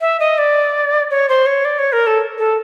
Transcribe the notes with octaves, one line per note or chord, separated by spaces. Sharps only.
E5
D#5
D5
C#5
C5
C#5
D5
C#5
A#4
A4
A4